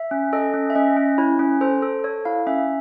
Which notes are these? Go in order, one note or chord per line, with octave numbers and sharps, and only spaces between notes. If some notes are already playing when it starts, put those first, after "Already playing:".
Already playing: E5
C#4
A4 D#5
C#4
E5
C#4 D#5
C#4
E4 C#5
C#4
A4 C5
A4
A4 C#5
E4 F5
C#4 E5